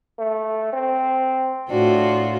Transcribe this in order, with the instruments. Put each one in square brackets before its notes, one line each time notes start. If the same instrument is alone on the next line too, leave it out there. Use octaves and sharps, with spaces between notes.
[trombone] A3
C4
[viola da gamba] A2 F4 F#4 [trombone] D4